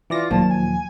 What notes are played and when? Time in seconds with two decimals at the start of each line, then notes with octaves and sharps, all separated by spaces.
0.10 E3 F4 D5 A#6
0.31 D#2 A#2 F3 F#3 A5
0.49 G#5